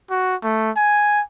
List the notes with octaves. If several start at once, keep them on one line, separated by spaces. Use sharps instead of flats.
F#4
A3
G#5